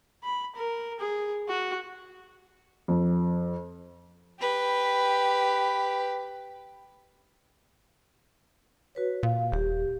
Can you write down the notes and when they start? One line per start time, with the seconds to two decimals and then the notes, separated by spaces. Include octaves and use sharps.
0.24 B5
0.56 A#4
1.00 G#4
1.48 F#4
2.88 F2
4.40 G4 B4
8.95 F#4 B4 C#5
9.23 A#2 F5
9.52 D#1 G4